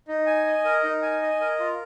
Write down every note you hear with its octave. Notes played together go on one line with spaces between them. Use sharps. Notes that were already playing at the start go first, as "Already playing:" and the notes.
D#4
G#5
D#5
A#4
D#4
G#5
D#5
A#4
F4